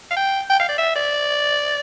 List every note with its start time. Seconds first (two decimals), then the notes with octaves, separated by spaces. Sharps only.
0.11 F5
0.17 G5
0.50 G5
0.60 F5
0.69 D5
0.78 E5
0.96 D5